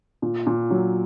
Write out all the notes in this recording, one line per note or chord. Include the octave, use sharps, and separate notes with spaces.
A#2
A#2
F#3